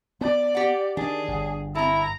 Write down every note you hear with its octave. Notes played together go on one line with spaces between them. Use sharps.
B3 D5
G4 F#5
D#3 D4 G#4
G1
C4 E4 A4 A#5